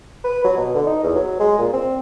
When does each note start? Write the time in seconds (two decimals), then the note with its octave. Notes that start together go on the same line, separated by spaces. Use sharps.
0.24 B4
0.44 F#3
0.57 B2
0.75 D3
0.87 D#4
1.03 E2
1.15 F#3
1.40 G#3
1.59 A#2
1.73 C4